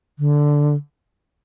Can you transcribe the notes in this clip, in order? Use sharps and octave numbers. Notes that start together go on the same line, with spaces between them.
D3